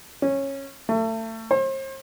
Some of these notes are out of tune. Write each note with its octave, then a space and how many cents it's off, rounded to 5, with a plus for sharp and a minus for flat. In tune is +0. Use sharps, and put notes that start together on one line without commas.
C#4 -15
A3 +30
C5 +40